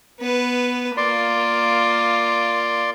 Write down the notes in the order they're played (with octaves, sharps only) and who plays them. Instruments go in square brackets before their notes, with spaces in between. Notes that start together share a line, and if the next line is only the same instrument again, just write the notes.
[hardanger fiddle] B3 B4
[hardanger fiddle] A#3 F4 [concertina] D5 C6